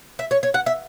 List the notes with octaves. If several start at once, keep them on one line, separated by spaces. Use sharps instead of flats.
E5
C#5
C#5
F#5
E5